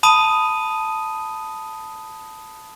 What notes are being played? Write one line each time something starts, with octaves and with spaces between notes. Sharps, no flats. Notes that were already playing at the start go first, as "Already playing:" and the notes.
A5 B5 D#6 D#7